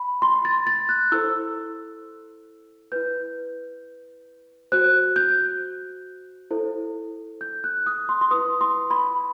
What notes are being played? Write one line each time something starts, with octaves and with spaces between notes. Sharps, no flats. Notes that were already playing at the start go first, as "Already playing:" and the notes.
Already playing: B5
C6
A6
A6
F#6
E4 A4 C5 E6
E4 B4 G6
F#4 C5 F#6
G6
E4 A4 C5
G6
F#6
D#6
C6
C6
E4 B4 D#6
C6
B5